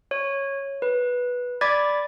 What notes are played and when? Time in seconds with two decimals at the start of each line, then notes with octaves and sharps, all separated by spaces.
0.11 C#5
0.82 B4
1.61 D5 B5 D6 G#6 A6 B6